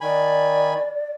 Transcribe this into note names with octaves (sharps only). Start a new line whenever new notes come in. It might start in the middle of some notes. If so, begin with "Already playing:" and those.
D#3 D5 G#5 B5